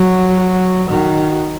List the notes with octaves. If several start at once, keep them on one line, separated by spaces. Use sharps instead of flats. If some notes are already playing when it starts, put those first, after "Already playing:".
Already playing: F#3 F#4
F#4
D#3 F#4